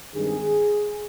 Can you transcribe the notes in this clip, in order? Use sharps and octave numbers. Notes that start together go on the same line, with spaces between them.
G2 D#3 G#3 C4 G#4